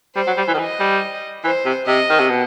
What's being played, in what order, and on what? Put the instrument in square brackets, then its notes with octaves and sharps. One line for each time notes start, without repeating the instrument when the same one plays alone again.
[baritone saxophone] G3 [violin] C5
[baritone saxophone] F#3
G3
E3
D#3
[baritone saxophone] E3 [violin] D#5
[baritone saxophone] G3
[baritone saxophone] E3 [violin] C5
[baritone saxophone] C3
[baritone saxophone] C3 [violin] D#5
[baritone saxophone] D#3
C3
B2